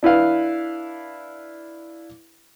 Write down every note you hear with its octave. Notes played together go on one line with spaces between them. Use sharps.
D4 E4 B4 F5